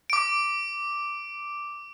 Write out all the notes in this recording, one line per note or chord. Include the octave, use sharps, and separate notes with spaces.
D6 D7